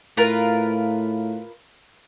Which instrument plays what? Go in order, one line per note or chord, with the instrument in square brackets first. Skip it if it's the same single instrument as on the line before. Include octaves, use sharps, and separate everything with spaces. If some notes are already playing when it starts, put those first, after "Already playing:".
[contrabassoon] A2 [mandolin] F4 A#4 B4